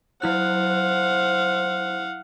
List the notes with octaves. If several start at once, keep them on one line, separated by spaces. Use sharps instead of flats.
F#3 E4 C5 F5 F#5 F#6